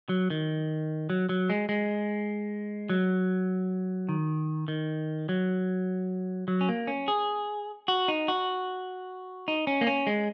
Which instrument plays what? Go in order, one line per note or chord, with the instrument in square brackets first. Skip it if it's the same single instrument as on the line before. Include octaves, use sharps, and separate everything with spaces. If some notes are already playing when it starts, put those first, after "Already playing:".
[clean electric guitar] F#3
D#3
F#3
F#3
G#3
G#3
F#3
D#3
D#3
F#3
F#3
C#4
A#3
C#4
G#4
F#4
D#4
F#4
D#4
C#4
A#3
C#4
G#3